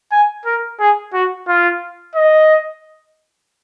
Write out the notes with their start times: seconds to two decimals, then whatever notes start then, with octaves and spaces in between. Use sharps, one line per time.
0.12 G#5
0.46 A#4
0.80 G#4
1.14 F#4
1.48 F4
2.15 D#5